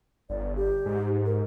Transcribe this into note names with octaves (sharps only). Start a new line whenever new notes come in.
G1 D5
G4
G#2
A#4